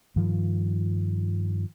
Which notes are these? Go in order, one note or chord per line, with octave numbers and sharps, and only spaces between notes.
G2 D#3 F3